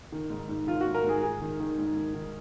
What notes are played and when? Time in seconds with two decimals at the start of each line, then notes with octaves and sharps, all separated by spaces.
0.12 D#3
0.30 G#2
0.49 G#2
0.67 D#3 F4
0.81 F#4
0.86 G#2
0.95 A#4
1.04 G#2 G#4
1.23 D#3 G#4
1.41 D#3
1.60 D#3
1.78 G#2
1.97 D#3
2.15 D#3